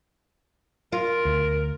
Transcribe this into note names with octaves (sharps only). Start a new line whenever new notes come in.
F4 A#4
D2